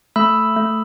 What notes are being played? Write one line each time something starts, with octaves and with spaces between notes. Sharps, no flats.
A3 B5 E6
A3